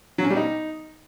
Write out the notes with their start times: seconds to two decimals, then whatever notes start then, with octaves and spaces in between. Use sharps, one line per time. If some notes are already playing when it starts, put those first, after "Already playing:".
0.18 F#3
0.24 C#4
0.30 G3
0.37 D#4